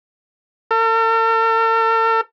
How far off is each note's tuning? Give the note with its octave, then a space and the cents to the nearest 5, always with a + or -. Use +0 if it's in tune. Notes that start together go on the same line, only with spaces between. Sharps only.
A4 +45